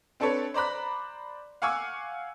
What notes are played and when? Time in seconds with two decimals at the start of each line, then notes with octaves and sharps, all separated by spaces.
0.20 C4 D4 A4 B4 C#5
0.54 C5 D5 A#5 B5 F#6
1.62 F5 F#5 G#5 C#6 D6 E6